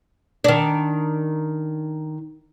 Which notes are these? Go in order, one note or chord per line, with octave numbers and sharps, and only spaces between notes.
D#3 D4